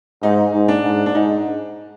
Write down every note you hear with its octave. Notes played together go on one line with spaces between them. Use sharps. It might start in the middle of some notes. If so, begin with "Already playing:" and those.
G#2 D#4
G#2
D4
G#2
D4
G#2 D#4